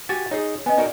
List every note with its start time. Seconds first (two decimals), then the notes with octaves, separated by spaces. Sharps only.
0.09 F#4 G4 G#5 A6
0.31 D#4 G#4 C#5
0.66 B3 C#4 D#5 G#5
0.78 D#4 F#4 A#4 D5